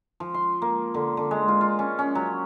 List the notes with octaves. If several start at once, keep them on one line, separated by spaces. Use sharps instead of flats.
F3
C6
A#3
D3
D3
G#3
F4
F4
C#4
C#4
F#3